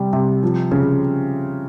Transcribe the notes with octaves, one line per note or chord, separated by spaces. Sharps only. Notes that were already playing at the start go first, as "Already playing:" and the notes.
Already playing: C3 G3
C3
F3
C#3